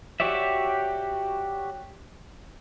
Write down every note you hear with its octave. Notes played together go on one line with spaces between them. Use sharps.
F#4 G4 C#5 D5 E5